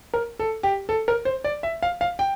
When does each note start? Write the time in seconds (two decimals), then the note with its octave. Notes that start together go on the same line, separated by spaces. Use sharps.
0.14 A#4
0.39 A4
0.63 G4
0.89 A4
1.08 A#4
1.25 C5
1.44 D5
1.63 E5
1.83 F5
2.01 F5
2.19 G5